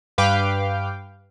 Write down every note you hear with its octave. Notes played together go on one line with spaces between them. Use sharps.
G2 B4 F5 G5 D6